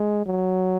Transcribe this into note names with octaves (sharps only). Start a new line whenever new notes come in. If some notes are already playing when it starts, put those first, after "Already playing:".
Already playing: G#3
F#3